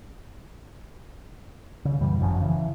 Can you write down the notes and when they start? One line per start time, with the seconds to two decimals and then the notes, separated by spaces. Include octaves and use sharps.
1.85 C#3
2.01 F#2 B2 E3 G3
2.20 G1 F#2 F3 C#4
2.42 C#3 E3